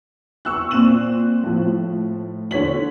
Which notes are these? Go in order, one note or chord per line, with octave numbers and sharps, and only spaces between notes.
C#6 E6 F#6
A#2 C4 F#6 E7 F#7
A2 F3
D3 C#5 B6 F#7